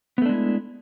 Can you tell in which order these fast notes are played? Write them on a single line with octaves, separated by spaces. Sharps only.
B3 A3 D4 G#3 E4